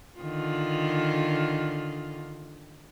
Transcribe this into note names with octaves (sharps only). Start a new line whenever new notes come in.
D3 D#3 F4